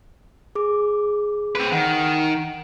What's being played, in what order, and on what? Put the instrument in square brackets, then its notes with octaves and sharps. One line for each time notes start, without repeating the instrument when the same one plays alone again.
[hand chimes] G#4 D6
[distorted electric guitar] C4 B4
[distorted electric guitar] D#3 [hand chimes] F#5